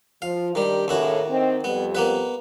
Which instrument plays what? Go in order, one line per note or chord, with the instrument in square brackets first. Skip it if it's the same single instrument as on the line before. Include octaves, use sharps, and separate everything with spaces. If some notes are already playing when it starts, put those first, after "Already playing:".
[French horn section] F3 [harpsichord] F5
[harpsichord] D#3 G3 [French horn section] D4 G4 A#4
[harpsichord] D#2 E4 F#4 [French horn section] A2 C#3
[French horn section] D#3 C4
[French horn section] F2 G3 [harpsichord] B3
[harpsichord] A#3 B3 B4